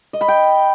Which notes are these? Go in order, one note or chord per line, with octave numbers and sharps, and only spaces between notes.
D#5
B5
G5